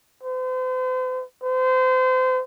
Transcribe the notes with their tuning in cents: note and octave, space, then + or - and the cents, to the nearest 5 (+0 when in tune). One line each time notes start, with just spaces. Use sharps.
C5 -40
C5 -30